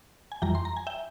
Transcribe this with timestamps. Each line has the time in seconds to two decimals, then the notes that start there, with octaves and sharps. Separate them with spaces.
0.32 G#5
0.42 F2 E3 G3 G5 A#5
0.55 C6
0.65 A#5
0.77 G#5
0.87 E5 G5